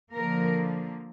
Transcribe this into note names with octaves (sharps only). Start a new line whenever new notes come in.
D3 F3 A#3 A#4